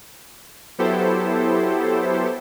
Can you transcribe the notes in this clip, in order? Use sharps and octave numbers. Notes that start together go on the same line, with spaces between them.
F#3 B3 E4 G4 A4 C5